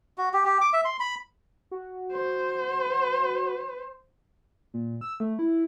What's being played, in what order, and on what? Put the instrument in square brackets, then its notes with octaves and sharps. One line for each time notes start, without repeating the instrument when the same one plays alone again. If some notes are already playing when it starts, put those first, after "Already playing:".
[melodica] F#4
G4
G4
D6
E5
C6
B5
[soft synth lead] F#4
[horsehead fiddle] C5
[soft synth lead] A#2
E6
A3
E4